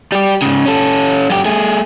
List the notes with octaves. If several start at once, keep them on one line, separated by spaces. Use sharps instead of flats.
G3 G4
G#2 C#3
C#4 A4
F#2 G4
A3 G#4